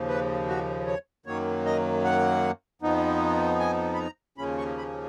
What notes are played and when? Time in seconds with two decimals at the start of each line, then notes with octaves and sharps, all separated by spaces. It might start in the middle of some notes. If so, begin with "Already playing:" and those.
Already playing: D#2 C#3 F3
0.08 B4
0.48 F#4
0.87 C#5
1.26 F#2 D#3 F#3 A#3 C#5
1.66 D#5
2.04 F#5
2.82 F2 F3 B3 D#4
3.60 G#5
3.94 B5
3.99 A#5
4.38 D#2 C#3 F3 A#3 C#4 B5
4.58 C#6
4.78 B5